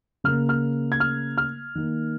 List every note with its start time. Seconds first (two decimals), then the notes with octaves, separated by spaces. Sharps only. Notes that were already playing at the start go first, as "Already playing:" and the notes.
0.24 C#3 A#3 F6
0.49 F6
0.92 G#6
1.00 F6
1.38 F6
1.75 D#3 A#3